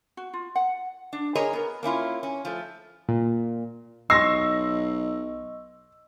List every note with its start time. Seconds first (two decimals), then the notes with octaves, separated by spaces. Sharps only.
0.17 F#4
0.33 F4
0.55 F#5
1.13 D4
1.35 G#4 A#4 C#5 D#5 A#5
1.53 B3 A#4
1.83 A#3 C#4 E4 F4
2.23 C#4
2.45 F3 A3
3.09 A#2
4.10 B1 D#5 C6 C#6 E6 A#6 C7